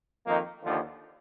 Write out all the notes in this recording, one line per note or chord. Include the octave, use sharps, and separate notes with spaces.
F2 D#3 A#3 D#4
D#2 D3 F3